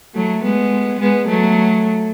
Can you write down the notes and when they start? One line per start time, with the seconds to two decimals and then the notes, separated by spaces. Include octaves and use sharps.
0.15 F#3 A3
0.44 G#3 B3
1.00 G#3 B3
1.28 F#3 A3